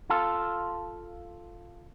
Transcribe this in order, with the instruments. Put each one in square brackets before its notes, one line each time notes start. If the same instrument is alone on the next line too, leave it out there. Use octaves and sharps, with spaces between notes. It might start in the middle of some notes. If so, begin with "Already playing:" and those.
[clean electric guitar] F4 A4